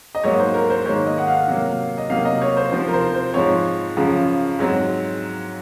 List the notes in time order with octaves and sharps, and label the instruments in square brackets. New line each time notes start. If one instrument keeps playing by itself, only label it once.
[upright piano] D#5
G#2 F#3 A#3 C#5
C5
A#4
C5
G#2 D#3 A#3 C#5
D#5
F#5
F5
C3 F#3 A#3
D#5
C3 F#3 A#3 F5
D#5
C#5
C5
C3 F3 C4 C5
A#4
C5
C5
G#2 F3 C4 C#5
F#2 C#3 F3
G#2 F#3 C4